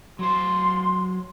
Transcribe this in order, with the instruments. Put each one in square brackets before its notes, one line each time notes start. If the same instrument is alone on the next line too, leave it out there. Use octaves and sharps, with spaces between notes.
[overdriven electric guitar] F#3 C5 [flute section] C6